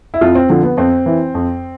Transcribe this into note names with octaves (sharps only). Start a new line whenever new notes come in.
E4
F2 F4
C4
D3 F3
B3
F2 C4
E3
F2